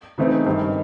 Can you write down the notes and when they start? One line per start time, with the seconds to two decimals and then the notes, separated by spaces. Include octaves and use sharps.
0.18 C#3 E3 A3 C4 D#4
0.46 G#1 G2 D#3